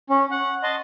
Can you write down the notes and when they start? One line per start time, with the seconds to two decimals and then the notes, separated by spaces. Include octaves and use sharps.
0.10 C#4
0.31 F#5
0.63 D#5 A5 C6